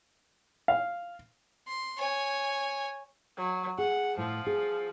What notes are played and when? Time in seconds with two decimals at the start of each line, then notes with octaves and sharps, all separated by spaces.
0.68 F5
1.67 C6
1.98 C#5 G#5
3.38 F#3
3.78 G#4 F#5
4.18 A2 F3
4.47 G#4